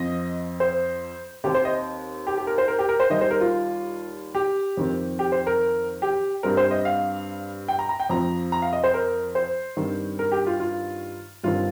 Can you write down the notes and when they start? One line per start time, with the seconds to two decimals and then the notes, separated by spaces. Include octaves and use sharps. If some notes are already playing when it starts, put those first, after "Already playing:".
Already playing: F2 F3 C4 D#5
0.60 C5
1.44 D#2 D#3 C4 G4
1.54 C5
1.65 D#5
2.27 G4
2.37 G4
2.47 A#4
2.58 C5
2.68 A#4
2.79 G4
2.89 A#4
3.00 C5
3.10 D#2 D#3 G3 D#5
3.21 C5
3.31 A#4
3.41 F4
4.35 G4
4.77 F2 D#3 C4
5.19 G4
5.32 C5
5.47 A#4
6.02 G4
6.43 G2 G3 C4 A#4
6.57 C5
6.71 D#5
6.85 F5
7.68 G5
7.79 A#5
7.89 A#5
8.00 G5
8.09 F2 F3 C4 A#5
8.52 A#5
8.62 F5
8.73 D#5
8.84 C5
8.94 A#4
9.35 C5
9.77 G2 D#3 C4
10.19 A#4
10.32 G4
10.47 F4
10.60 F4
11.44 G1 G2 D#3 C4 F4